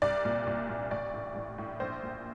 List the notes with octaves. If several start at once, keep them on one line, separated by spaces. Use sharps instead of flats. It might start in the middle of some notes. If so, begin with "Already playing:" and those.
C2 D5
A#2
C2
A#2
A1 D5
A2
A1
A2
A#1 C5
A#2